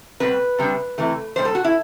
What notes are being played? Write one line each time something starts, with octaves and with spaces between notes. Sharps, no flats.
B2 G3 C4 B4
C3 G3 B3 D4
C3 E3 A3
B2 G3 D4 C5
A4
F#4
E4